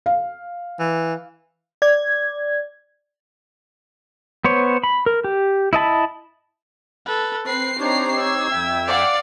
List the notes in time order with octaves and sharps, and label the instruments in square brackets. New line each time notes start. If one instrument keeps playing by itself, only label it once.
[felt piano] F5
[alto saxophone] E3
[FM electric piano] D5 G#6
[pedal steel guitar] B3 C5 C#5
B5
A#4
G4
E4 D#5 A5 B5
[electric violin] A4 B4
[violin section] C4 C7 [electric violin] B4
[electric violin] D4 A#5 [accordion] D#4 G4 C#5
[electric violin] E6 G#6
[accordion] F2 E5 G5
[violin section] D5 F5 F#5